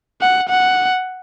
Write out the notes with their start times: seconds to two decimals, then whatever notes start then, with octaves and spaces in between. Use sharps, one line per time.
0.21 F#5
0.49 F#5